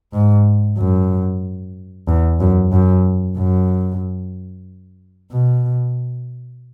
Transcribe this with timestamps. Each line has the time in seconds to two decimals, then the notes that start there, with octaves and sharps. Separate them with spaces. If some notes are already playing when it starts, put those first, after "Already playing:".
0.13 G#2
0.78 F#2
2.08 E2
2.41 F#2
2.72 F#2
3.38 F#2
5.32 B2